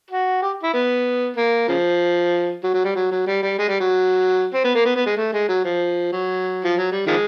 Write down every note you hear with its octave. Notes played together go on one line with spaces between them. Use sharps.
F#4
G4
E4
B3
A#3
C#3 F3
F#3
F#3
G3
F#3
F#3
G3
G3
G#3
G3
F#3
C4
B3
A#3
B3
B3
G#3
A3
G#3
F#3
F3
F#3
F3
F#3
G3
D#3 F3 G#3